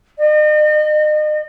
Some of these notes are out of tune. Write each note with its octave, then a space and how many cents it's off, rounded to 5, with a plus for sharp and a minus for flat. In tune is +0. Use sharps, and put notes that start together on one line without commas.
D#5 -40